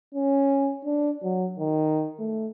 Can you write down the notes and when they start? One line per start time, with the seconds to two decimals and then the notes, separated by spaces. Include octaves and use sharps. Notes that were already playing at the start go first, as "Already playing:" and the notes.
0.14 C#4
0.85 D4
1.23 F#3
1.59 D#3
2.19 A3